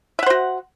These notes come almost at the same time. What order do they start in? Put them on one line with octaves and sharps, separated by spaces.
E5 F#5 C5 F#4